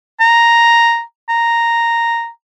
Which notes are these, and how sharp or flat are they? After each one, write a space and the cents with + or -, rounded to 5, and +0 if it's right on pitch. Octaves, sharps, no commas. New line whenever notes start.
A#5 +0
A#5 -5